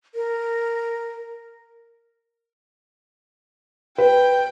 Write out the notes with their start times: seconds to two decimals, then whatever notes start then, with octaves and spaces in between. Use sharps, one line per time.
0.15 A#4
3.98 B4 G5